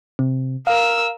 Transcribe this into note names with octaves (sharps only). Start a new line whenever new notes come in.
C3
A#4 F5 E6